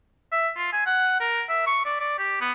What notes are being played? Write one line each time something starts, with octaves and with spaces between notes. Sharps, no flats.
E5
F4
G#5
F#5
A#4
E5
C#6
D5
D5
G4
B3